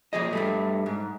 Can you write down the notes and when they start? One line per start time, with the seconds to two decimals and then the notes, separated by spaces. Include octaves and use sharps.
0.13 A#2 F3 G#4 D#5
0.33 G2 G3 A3
0.86 G#2